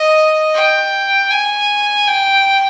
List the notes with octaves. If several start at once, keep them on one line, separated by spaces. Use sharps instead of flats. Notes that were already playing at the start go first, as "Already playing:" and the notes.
Already playing: D#5
G5
G#5
G5